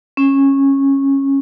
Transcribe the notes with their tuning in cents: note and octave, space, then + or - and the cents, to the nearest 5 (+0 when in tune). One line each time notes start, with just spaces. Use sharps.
C#4 -15